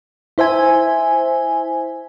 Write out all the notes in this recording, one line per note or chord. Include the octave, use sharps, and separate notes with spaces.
E4 C5 E5 G#5